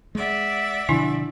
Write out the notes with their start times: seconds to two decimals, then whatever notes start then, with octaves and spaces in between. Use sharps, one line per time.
0.15 G#3 D5 E5 F#5
0.89 B2 D3 F3 D4 E4 G#5